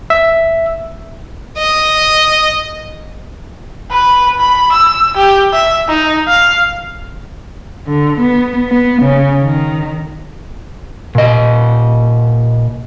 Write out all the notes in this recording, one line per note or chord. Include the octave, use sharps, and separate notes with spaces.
E5
D#5
B4
B5
E6
G4
E5
D#4
F5
D3
B3
B3
C#3
D#3
A#2 D#5